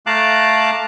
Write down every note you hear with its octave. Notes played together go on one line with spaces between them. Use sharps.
A3 F5 A5 A#5 D6 F#6